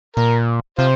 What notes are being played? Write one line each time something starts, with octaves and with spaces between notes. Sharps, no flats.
A#2 A#4
C3 F4 C5